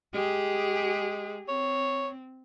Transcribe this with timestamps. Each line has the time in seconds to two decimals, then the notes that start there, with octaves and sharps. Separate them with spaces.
0.15 G#3 G4 G#4
1.49 C4 C#5